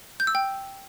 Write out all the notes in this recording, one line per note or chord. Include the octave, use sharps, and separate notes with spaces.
G6
E6
G5